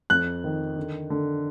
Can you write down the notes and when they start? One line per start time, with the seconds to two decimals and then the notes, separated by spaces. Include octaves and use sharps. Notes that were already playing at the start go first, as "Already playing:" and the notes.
0.10 F2 F#6
0.44 D#3
0.77 D3
1.10 D3